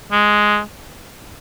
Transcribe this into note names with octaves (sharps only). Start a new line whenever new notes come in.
G#3